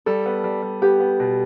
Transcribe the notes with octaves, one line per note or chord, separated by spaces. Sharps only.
G3 A4
B3
G3
G3
B3 G4
B3
B2